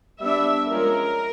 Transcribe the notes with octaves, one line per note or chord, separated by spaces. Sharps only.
G3 B3 D4 E5
F3 G#3 C#4 A#4